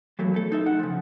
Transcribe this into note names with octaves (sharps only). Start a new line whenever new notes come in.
E3 F#3 A3 A#3
A3 A4
D#4 A4 E5
F#5
C#3 F3